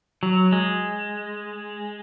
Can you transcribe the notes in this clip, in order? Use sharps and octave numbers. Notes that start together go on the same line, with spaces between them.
F#3
G#3